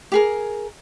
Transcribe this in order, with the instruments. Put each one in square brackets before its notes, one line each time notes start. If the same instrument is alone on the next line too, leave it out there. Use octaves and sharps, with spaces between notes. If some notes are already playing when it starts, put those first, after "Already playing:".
[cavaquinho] G4 G#4 A#4